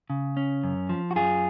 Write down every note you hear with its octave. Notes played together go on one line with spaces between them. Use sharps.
C#3
C#4
F#2
F3
F#4
F#2 F4 G#4